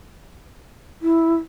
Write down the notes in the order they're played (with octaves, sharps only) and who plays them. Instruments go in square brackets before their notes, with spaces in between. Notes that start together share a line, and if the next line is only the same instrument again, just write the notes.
[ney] E4